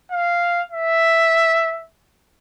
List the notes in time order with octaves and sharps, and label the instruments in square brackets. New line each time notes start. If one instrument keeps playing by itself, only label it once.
[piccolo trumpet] F5
E5